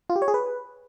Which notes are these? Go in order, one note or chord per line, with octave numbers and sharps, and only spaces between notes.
F4
G4
C#5
G#4
B4